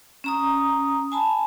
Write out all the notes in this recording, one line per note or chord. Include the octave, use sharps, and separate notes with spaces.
C#4 A#5 D#6
G#5 A5 B5